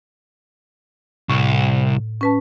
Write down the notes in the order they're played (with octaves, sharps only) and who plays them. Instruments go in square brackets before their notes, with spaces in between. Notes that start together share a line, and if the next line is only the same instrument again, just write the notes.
[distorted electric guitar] C2 [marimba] A2
[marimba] C#4 B4 A5